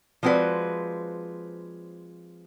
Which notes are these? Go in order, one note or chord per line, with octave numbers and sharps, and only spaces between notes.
F3 G#3 C4 F#4 B4 D5